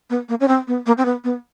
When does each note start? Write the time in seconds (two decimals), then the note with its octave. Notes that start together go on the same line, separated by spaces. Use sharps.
0.10 B3
0.29 A#3
0.40 C#4
0.48 C4
0.67 B3
0.86 A#3
0.98 C4
1.05 B3
1.24 B3